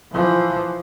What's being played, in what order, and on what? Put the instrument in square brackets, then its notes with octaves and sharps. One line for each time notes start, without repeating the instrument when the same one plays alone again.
[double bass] E3 F3